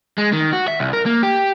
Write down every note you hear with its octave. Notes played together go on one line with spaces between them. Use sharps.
G#3
D#3
F#4
E5
C2
A#4
A#3
G4